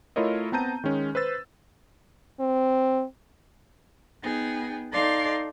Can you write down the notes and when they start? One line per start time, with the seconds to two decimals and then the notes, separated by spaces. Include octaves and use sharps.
0.16 A3 E4 F4 A#4 C#5 D#5
0.52 B3 C4 A5 A#5 G6 D#7
0.84 D#3 G#3 C#4
1.15 B4 C5 E6 A6
2.40 C4
4.22 B3 D#4 G#4 G5
4.92 D#4 A4 D5 F5 C6